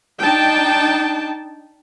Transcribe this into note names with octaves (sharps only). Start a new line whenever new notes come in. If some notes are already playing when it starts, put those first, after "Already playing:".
D4 D#4 G5 A5